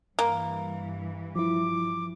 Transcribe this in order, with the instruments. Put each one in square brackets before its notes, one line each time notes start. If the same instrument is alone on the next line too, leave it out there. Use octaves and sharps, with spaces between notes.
[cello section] G2 E3 [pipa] A#3
[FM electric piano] F3 E4 [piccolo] D6